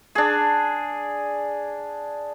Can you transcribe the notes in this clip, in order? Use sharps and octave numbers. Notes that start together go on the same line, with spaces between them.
D4 G#4